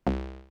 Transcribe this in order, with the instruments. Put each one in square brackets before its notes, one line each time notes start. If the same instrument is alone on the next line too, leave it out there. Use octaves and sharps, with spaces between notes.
[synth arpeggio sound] C2